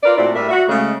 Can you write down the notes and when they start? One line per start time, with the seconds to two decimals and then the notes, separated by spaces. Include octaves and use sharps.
0.03 F4 A#4 B4 D5
0.18 A#2 A3 C4 E4 F#4 D5
0.35 A2 G3 D4 A#4 E5
0.49 F#4 E5
0.69 C#3 G#3 A3